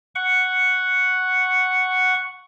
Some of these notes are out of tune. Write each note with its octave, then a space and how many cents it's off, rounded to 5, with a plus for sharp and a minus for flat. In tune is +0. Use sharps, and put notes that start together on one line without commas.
F#5 +0 C#6 +0